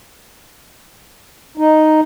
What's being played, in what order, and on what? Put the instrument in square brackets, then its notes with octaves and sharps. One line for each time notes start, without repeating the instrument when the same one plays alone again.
[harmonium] D#4